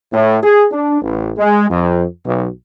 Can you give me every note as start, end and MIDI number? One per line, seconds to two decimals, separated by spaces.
0.13 0.39 45
0.43 0.66 68
0.72 1.01 62
1.02 1.32 33
1.38 1.70 56
1.70 2.05 41
2.26 2.48 35